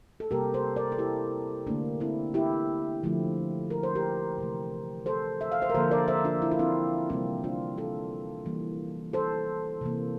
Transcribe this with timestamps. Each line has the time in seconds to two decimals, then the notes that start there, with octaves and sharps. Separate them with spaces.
0.20 A4
0.31 C3 G3 A#3 G4 A#4
0.54 A4 C5
0.76 A#4 D5
0.92 A4
0.98 E4 G4
1.67 D3 A3 A#3 D4
2.00 C4 E4
2.34 E4 G4
3.03 D3 F3 A3
3.70 A#4
3.83 C5
3.95 G4 A#4
4.38 C3 E3 A3
5.06 A4 C5
5.41 E5
5.52 F5
5.62 C5 E5
5.70 A#4
5.74 D3 F3 A#3 A4 C5
5.91 A#4 D5
6.08 C5 E5
6.24 D4 F4
6.42 E4
6.51 F4
6.59 C4 E4
7.09 C3 E3 G3 A#3 C4 E4
7.44 D4 F4
7.78 F4 A4
8.46 E3 G3 A#3
9.13 A4 C5
9.81 C3 E3 A#3